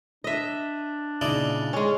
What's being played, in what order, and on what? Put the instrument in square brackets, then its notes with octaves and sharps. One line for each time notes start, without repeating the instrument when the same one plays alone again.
[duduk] D4 [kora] D#5 E5
[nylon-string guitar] A#2 C#3 [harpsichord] D#4 E4 D5
[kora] G#3 C#4